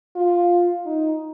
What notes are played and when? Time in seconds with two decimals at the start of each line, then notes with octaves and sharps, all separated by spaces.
0.16 F4
0.86 D#4